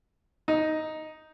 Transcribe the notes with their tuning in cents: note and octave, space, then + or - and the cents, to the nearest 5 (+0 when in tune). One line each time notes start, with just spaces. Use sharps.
D#4 +5